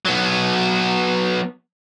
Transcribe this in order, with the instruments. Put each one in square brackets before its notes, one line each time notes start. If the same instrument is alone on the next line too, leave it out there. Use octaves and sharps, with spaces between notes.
[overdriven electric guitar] F#3 B3